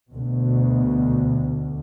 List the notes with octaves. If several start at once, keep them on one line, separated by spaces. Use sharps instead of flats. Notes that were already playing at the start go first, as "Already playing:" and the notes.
D2 B2